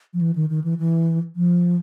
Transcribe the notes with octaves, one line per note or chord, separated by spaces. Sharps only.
F3
E3
D#3
D#3
E3
E3
F3